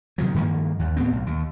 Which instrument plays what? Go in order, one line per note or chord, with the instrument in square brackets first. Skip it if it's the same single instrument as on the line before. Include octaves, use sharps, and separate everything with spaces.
[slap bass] C3 D#3 F3 F#3
G2 D#3 F3 A#3
D#2
A2 B3 C4
B1
D#2